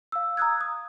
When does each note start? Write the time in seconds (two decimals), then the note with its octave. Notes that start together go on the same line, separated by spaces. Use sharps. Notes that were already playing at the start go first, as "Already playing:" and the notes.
0.12 F5 E6
0.37 A#5 D#6 E6 F#6 G#6
0.61 D#6